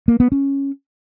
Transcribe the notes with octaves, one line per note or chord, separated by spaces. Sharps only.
A#3
B3
C#4